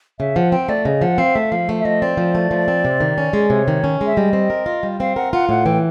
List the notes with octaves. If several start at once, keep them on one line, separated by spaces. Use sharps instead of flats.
C#3 E5
F3 F#5
C4 G5
A3 D5
C#3 D#5
F3 F#5
C4 F5
A3 E5
F3 F5
A3
E5
F3 D#5
C4 D5
F3
A3
F3
C4
C3
D#3
C#4
G#3
C3 C#5
D#3
C#4
G#3
E5
G3 D#5
C4
A#4
F4
G3
C4 F5
A#4 F#5
F4 F#5
A2 F#5
E3 G5